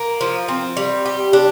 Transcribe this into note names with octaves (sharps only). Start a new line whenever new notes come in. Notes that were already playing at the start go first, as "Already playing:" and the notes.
Already playing: A#3
F3
C4
G3
G4
D4